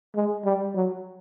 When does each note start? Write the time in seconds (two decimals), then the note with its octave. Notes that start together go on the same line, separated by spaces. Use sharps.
0.15 G#3
0.45 G3
0.75 F#3